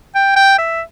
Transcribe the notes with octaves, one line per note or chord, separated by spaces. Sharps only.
G5
G5
E5